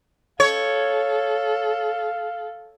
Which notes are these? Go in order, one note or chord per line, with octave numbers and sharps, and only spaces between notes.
A4 C#5 F5